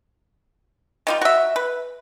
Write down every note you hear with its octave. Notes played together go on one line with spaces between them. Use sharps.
D#3 G3 F4
F#4 E5
B4